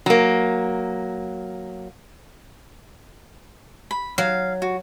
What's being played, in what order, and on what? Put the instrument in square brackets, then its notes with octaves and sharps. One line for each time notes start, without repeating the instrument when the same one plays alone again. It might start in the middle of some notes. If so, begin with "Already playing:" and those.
[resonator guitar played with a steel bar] F#3 A#3
[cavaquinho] B5
[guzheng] F#3 [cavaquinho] F5
[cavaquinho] F#4